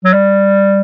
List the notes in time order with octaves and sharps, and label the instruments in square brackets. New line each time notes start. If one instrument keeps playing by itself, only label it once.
[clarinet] F#3
G3